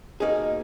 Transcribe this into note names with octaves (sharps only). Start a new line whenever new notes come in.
B2 A#3 D#4 G#4